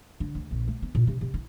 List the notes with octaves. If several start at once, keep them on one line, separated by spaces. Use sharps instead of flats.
D3
D2
A#1
A3
B3
A#2
C3
C3
E4